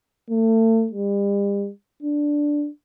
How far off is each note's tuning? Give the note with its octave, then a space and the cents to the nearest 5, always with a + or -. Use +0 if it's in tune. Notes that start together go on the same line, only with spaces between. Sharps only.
A3 +35
G3 +40
D4 +0